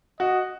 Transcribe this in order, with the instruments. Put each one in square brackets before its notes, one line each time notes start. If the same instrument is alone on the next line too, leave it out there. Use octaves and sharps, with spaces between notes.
[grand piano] F#4 [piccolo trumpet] D#5